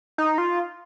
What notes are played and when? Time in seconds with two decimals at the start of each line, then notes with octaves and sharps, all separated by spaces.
0.18 D#4
0.38 F4